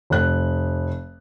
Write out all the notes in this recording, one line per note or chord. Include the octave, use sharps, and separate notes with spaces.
F1 F#6